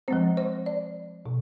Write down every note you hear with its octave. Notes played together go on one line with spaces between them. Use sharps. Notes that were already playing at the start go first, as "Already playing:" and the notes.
F3 G#3 C4 C5
C5
D5
B2